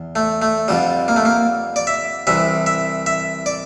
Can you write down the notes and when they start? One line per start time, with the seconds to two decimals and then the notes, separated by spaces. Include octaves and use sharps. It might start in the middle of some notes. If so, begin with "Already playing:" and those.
Already playing: E2
0.16 A3
0.42 A3
0.68 F2 D3 G3
1.08 A#3
1.16 A3
1.26 A#3
1.76 D5
1.87 E5
2.27 C2 C3 E3 E5
2.66 E5
3.06 E5
3.46 D5